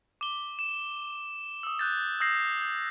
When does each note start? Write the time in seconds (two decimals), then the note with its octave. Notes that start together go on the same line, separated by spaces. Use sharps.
0.21 D6 G7
0.59 E7
1.63 D#6 E6
1.79 F#6 G6 A6
2.20 D#6 E6 G6 A#6 C7
2.61 G6